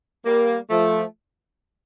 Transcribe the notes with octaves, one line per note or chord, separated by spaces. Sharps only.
G3 A#3
F3 A3